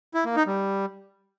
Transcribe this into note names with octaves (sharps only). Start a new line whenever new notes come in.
E4
A#3
D#4
G3